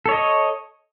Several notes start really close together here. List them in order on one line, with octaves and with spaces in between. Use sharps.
A4 C#5 D#5